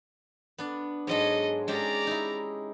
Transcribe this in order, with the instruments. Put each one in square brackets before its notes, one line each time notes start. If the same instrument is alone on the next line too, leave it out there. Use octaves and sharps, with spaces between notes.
[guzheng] B3 D4
[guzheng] G#2 F#3 G#3 [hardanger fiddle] A4 D#5
[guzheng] G#3 C#4 G4 [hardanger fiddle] D5 A#5
[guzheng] D#4 E4